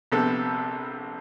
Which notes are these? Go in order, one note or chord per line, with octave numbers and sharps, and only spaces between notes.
A#1 C3 B3 A4